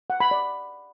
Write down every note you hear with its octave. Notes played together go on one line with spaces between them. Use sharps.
F#5
B5
D5